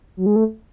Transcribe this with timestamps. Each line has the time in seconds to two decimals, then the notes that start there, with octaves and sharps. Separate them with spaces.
0.17 F#3
0.26 G#3
0.36 A3